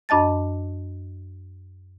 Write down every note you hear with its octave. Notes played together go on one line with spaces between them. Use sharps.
F#2 D4 D#5 A5 A6